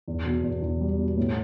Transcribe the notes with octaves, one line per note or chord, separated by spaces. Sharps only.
E2
B2
E2
E2
G3
B2
A2